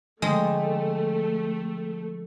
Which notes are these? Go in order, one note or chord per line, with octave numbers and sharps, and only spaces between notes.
D3 F3 G#3 A3 C4